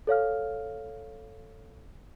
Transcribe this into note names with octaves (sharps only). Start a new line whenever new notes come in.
A4 C#5 F5 F6